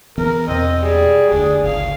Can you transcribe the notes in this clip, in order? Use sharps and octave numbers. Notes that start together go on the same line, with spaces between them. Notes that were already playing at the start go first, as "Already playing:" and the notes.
E3 B3 A#4
E2 B2 C4 D#5
G3 G#4
F1 D2 D4
G1 C#2 F5